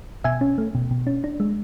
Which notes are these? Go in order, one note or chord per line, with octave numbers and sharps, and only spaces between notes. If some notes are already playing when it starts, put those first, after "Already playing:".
B2 E5 G#5
C#4
A3
B2
B2
C#4
D4
G#3